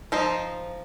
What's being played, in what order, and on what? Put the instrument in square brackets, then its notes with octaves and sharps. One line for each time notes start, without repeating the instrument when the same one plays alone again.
[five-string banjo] F3 D#4 C5